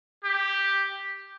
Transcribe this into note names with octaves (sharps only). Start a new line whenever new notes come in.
G4